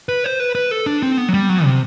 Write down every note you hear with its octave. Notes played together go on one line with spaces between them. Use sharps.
B4
C5
B4
B4
A4
D4
C4
B3
F#3
G3
F#3
C3